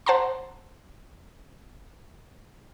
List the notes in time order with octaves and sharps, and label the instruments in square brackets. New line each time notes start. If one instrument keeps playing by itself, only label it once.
[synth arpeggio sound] C5 F#5 A5 A#5 C6